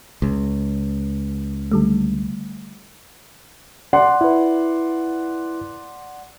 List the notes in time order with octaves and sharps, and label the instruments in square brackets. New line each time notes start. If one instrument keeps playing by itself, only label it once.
[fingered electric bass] C#2
[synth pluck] D3 G3 A3
[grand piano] D5 F#5 C6
[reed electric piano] E4 B4